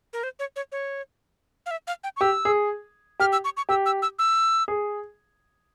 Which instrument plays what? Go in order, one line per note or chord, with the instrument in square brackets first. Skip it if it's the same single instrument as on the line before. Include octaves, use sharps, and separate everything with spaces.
[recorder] A#4
C5
C#5
C#5
C#5
F5
E5
F5
G5
C#6
[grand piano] G4 [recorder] E6
[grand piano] G#4
[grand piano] G4 [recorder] F6
[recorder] E6
C#6
C#6
[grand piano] G4 [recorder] E6
[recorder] E6
E6
E6
[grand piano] G#4